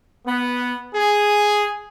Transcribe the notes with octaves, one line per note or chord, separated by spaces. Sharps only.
B3
G#4